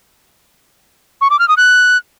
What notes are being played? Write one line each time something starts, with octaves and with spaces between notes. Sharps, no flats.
C#6
D6
F6
D#6
F#6